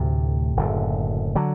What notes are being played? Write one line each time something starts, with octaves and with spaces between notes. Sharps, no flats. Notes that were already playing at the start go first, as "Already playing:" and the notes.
Already playing: D2 A2 C3 A3
F#1 F#2 D3
D3 F#3